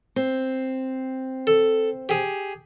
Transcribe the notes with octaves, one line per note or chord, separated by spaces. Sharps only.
C4
A4
G4 G#4